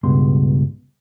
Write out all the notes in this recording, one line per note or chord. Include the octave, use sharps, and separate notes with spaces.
C#2 G2 B2 C6